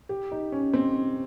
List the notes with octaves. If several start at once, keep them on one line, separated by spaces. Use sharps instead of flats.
G4
D#4
C#4
C4